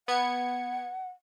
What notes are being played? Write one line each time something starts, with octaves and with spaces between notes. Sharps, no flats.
B3 F#5 G#6 C#7